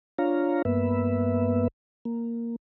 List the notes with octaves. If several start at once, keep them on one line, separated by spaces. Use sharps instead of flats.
D4 F4 C#5 F5 A#5
G2 A#3 B3 B4 E5
A#3